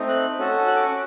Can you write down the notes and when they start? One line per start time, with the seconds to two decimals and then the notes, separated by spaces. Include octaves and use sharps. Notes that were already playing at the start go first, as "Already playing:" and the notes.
Already playing: A3 C4 D#4
0.09 F#6
0.38 C#4 F#4 A4
0.67 F#6
0.76 D6
0.86 C#6